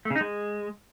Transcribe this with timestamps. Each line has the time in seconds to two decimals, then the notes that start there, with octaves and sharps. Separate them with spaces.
0.05 A3
0.10 C#3
0.16 D#4
0.21 G#3